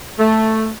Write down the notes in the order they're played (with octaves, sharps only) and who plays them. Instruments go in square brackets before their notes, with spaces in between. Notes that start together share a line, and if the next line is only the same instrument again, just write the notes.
[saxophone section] A3